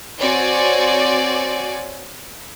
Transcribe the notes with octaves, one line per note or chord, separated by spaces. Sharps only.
C4 F#4 C#5 D5 G#5